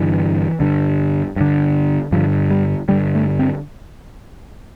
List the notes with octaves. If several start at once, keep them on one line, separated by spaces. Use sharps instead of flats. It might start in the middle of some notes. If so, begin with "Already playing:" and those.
Already playing: G2 D3 E3
G2 D3
G2 D3
G2 D3 F3
G3
G2 D3 G3
A3
C4